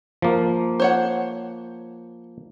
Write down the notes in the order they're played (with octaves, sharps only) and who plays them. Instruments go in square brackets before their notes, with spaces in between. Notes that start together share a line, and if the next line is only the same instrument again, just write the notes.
[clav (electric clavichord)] F3 A#3
[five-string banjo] C5 C#5 F#5